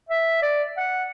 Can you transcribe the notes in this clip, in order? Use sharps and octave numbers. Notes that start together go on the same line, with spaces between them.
E5
D5
F#5